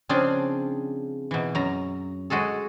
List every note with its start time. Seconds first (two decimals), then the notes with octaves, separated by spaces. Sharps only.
0.09 C#3 F3 C4 D4 F4 G#4
1.31 B2 E3
1.55 F#2 A#5
2.30 G#3 F#4 G#4 A4